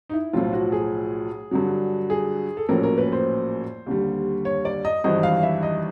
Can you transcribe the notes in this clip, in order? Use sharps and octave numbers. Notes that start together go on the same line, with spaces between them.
D#4
E4
B1 A2 F3 F4
F#4
G#4
G2 D3 F#3
G#4
A4
A#1 A2 F#3 A#3 C#4 A#4
A#4
B4
C5
D#2 D3 G3
C#5
D5
D#5
G#1 G2 E3 D#5
F5
E5
D#5